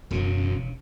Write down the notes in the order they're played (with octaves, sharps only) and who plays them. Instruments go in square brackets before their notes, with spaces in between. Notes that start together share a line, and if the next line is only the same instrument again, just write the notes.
[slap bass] E1 C#3 [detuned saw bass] F#2